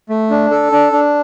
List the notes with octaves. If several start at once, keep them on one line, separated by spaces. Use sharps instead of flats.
A3
D4
A4
D4
D4